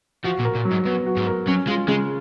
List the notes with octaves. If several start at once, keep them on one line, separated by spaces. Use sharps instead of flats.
F3 F#4
A#2
A#4
A#2
F#3
G#2
F#2 B3
F#4
G#2
A#4
F#3 C#4
G#3 F4
C#3 G#3